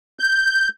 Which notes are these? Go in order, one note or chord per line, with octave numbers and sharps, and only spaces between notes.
G6